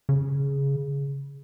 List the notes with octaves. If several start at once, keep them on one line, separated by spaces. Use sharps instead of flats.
C#3